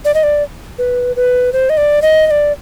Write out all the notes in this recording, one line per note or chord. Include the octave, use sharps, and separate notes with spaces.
D5
D#5
D5
B4
B4
C5
D#5
D5
D#5
D#5
D5